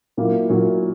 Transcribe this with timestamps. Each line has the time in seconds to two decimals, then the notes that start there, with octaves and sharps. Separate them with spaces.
0.17 A#2 F#3 A#3 E4
0.49 A#2 F#3 A#3 E4